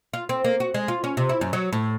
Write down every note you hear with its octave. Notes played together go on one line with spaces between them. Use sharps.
F4
C4
A#3
F#4
G#3
F4
C#4
C3
E4
F#2
F#3
A2